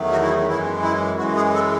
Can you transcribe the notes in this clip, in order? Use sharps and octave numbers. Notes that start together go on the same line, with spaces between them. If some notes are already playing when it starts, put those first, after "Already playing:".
Already playing: E2 D#3 F#3 A3
F#4
E4
D#4
F#2 E3 G#3 E4
E4
F#2 E3 G#3 F#4
G#4
A4